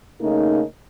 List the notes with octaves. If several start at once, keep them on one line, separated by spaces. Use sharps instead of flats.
C#3 A3 A#3 D#4